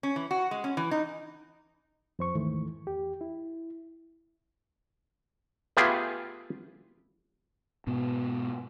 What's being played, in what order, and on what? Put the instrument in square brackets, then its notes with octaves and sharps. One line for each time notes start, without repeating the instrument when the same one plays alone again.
[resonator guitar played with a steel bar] C#4
E3
F#4
G#3
C#4
E3
D#4
[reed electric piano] F2 C5 C#6
D#2 G#2 D#3 E3 A3
E2 G4
E4
[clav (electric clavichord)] A3 B3 F4 G4 G#4
[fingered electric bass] G#2 B2 B3